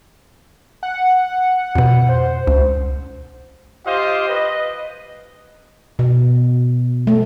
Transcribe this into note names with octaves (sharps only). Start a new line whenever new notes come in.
F#5
F2 B2
C5
C#2
F4 G4 C5 D#5 F5
B4 D#5
B2
A3